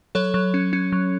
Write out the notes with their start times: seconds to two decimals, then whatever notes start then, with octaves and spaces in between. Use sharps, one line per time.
0.15 F#3 A4 C#5
0.34 F#3
0.54 C#4
0.73 C#4
0.92 F#3